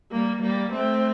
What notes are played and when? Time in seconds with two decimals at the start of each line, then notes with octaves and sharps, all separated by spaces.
0.12 G3 A#3
0.41 G3 A#3
0.70 A3 C4